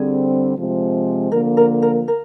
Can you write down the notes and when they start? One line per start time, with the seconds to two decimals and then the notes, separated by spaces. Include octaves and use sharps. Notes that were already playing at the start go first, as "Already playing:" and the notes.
Already playing: D3 G3 C4 G#4
0.57 C3 F3 G#3 C4
1.32 D3 F3 A#3 A#4
1.57 A#4
1.82 A#4
2.08 A#4